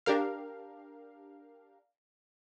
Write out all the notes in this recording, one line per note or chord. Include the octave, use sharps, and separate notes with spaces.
D4 G4 A#4 F5